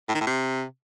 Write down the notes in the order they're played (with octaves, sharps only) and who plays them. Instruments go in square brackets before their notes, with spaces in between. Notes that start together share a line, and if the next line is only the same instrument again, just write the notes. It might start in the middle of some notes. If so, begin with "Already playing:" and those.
[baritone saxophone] A2
D#3
A2
C3